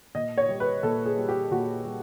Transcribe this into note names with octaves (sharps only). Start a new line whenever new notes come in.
A#2 D#5
C#5
G3
B4
A#2 A4
G#4
G3
G4
A#2 F#4
G3